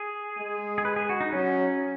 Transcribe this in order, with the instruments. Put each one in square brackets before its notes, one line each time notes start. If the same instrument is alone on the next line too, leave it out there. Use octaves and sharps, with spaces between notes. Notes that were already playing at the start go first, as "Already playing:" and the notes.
Already playing: [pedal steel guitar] G#4
[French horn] G#3
[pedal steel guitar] G#4
B4
G#4
F#4
D#4
[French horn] F#3 [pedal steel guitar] C#4